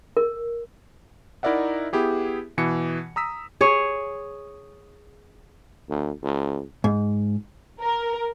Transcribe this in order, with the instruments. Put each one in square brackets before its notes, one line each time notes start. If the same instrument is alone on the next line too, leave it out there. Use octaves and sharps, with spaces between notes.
[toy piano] A#4
[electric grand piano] D#4 E4 A#4 D5 E5 F#5
B3 E4 G4 G#4
B2 E3 C#7
A#5 D#6 E6 B6
[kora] G#4 C#5
[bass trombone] D2
C#2
[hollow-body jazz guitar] G#2
[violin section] A#4